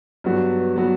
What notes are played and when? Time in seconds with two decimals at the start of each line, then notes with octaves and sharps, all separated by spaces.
0.24 G2 F#3 B3 F#4
0.76 F#3 B3 F#4